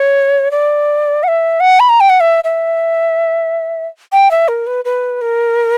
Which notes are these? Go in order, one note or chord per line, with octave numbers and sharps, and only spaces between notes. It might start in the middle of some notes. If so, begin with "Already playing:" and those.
Already playing: C#5
D5
F#5
E5
F#5
B5
A#5
G5
F#5
E5
E5
G5
E5
A#4
B4
B4
A#4